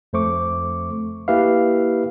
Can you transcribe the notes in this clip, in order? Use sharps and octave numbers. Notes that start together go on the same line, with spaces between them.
F2 A3 C5 C#6 D6
A#3 E4 G4 B4 E5 F5